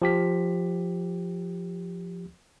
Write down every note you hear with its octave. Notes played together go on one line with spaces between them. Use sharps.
F3 G4 B6